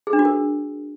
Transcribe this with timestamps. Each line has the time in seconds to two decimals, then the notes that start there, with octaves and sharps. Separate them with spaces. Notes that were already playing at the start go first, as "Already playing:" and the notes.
0.07 G#4
0.13 D4
0.19 F#4
0.25 A#4